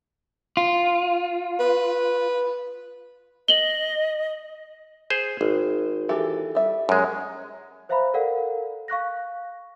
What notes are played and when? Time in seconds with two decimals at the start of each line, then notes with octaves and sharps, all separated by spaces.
0.57 F4
1.60 B4
3.48 D#5 F#7 G7
5.10 G#4 C5
5.41 G#1
6.09 E3 G4 A4
6.55 G3 E5
6.89 F#2 G#3
7.89 B4 C5 E5 F5 A#5 B5
8.14 A4 A#4 D5 F5 F#5
8.88 F5 C#6 F#6 A#6